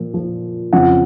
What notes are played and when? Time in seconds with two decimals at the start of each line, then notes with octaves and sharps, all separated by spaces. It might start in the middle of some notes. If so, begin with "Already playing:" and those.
Already playing: A#2 F3
0.14 A#2 F3
0.73 F2 C#3 F3 F#5